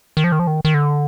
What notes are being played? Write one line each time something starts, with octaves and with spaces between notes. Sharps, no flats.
D#3
F3
D#3
F3
D#3
D#3
D3